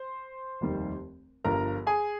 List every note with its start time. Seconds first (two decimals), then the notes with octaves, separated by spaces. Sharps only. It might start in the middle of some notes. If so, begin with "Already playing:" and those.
Already playing: C5 C6
0.61 F1 D#2 D#3 G3
1.44 G1 G2 F3 A#4 A#5
1.87 G#4 G#5